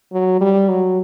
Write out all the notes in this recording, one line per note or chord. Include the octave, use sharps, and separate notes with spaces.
F#3
G3
F#3